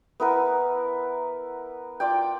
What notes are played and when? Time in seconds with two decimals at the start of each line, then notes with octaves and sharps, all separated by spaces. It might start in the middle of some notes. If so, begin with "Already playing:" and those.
0.20 B3 E4 A#4 B4
2.00 F4 D5 G5